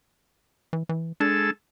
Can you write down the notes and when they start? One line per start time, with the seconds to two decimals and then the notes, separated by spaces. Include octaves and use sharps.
0.73 E3
0.89 E3
1.20 G#3 D4 A4 E6